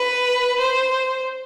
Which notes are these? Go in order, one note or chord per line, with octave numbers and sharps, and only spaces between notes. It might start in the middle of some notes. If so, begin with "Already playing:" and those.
Already playing: B4
C5